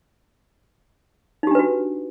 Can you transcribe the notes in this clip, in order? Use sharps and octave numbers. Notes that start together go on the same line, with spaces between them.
D4 D#4 F#4 G4 B4